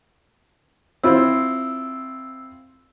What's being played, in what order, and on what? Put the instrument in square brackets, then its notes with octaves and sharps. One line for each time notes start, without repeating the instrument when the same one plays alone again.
[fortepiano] C4 E4 F4 [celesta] E6